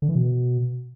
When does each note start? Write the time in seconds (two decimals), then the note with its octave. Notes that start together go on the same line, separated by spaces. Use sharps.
0.02 D3
0.09 E3
0.15 B2